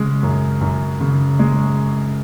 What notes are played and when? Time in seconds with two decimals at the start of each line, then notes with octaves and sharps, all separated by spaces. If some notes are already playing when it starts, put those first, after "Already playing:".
Already playing: C#3 G#3
0.23 F#2
0.61 F#2
1.01 C#3
1.39 G#3